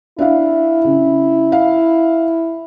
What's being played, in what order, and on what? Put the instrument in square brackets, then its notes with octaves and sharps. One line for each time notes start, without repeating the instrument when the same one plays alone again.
[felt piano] D4 E5 F5 [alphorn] E4
[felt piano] C#3
F5